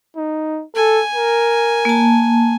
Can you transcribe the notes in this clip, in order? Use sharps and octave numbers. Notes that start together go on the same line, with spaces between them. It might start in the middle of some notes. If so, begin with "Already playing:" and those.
D#4
A4 G#5
A#4
A#3 A5